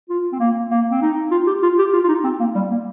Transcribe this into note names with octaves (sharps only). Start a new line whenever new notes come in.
F4
C4
A#3
A#3
C4
D#4
F4
G4
F4
G4
F4
F4
D#4
C4
A#3
G3
A#3